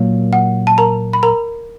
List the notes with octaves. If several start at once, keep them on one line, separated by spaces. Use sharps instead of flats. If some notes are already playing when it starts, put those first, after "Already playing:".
Already playing: A#2 F#3 A#3
F#5
A5
A#4 A#5
B5
A#4 A#5